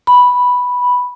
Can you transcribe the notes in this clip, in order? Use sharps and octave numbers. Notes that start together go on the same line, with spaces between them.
B5